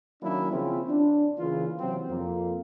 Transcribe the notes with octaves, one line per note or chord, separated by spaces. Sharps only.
D#3 F#3 A#3 C#4 D4 E4
C#3 F3 C4 C#4 E4 F4
D4
C#3 E3 A#3 F4
C3 E3 F#3 C4
F2 A#3